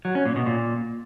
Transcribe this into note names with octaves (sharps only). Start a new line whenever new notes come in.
F#3
C#4
A#2
B2
A#2